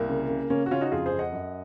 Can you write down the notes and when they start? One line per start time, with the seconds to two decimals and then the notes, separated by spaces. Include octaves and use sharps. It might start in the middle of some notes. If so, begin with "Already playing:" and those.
Already playing: C2 A#3
0.09 C#3
0.29 C#3
0.50 C#3 A#3 C#4
0.66 F#4
0.71 C#3 C#4 F4
0.81 D#4 F#4
0.92 F2 F4 G#4
1.06 G#4 C5
1.12 F2
1.19 D#5 F#5
1.32 F#2